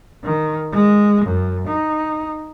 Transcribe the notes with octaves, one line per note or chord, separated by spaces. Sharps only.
D#3
G#3
F#2
D#4